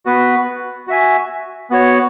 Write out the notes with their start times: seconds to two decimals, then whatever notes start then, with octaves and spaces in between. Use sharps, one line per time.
0.06 B3 F#4 B4
0.88 F#4 E5 G#5
1.70 B3 F#4 C#5